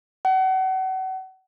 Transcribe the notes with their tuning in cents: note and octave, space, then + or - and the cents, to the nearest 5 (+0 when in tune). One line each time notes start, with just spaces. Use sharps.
F#5 +35